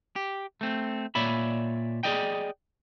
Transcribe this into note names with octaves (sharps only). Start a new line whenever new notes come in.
G4
A3 C4
A#2 C#5 D5 E5 B5
G#4 A4 D5 D#5 G5